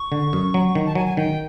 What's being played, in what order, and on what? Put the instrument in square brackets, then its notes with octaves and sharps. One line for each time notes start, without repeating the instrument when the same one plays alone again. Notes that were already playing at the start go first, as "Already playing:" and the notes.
Already playing: [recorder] C#6
[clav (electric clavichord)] D3
F#2
F#3
D#3
[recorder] A5
[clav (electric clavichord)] F#3 [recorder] G#5
[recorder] G#5
[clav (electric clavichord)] D#3 [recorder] G5